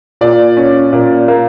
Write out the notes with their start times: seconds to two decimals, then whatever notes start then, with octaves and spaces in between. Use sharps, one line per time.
0.21 A#2 D5
0.57 C#4
0.93 A#2
1.28 A#3